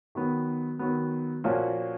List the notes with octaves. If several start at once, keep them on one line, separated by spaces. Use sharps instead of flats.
D#3 F#3 B3
D#3 F#3 B3
A#2 F3 A#3 C#4 F#4